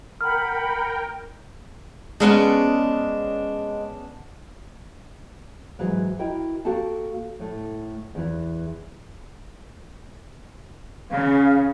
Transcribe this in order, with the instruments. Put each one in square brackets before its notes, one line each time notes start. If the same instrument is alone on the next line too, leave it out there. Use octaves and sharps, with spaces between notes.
[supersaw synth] A#4 G5 [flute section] F#5 B5 [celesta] F6
[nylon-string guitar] G#3 D#5 [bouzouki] B3 C#4 D4
[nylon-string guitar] G#2 E3 F#3 G#4 B4
E4 F#4 A#4 D#5 G5
A#3 F#4 G4 A4 A5
A2 A3
E2 E3 B4
[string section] C#3 [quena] F5